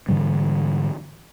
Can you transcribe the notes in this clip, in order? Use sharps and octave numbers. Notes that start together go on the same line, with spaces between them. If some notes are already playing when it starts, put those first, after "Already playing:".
G#2 D3 E3 G3